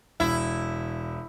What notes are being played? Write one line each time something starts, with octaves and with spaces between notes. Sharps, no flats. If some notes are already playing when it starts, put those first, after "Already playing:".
E1 E4